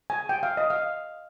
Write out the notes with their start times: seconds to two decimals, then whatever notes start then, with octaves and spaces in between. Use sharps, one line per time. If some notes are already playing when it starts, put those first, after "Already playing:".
0.10 G#5
0.29 G5
0.43 F5
0.57 D#5
0.70 F5